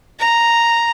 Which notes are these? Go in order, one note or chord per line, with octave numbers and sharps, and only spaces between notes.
A#5